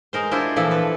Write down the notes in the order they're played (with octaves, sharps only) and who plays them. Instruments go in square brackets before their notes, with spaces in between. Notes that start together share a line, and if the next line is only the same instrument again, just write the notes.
[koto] G#3 A#4 C5
D4 E4 F4 C5
A#2 E3 F3 A4 E5
B4